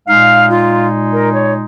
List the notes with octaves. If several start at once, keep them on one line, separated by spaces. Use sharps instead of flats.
A#2 G#3 D#4 F5
F4
A#4
C#5